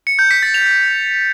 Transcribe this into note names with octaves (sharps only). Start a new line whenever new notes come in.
C#7
G6
B6
A6
F7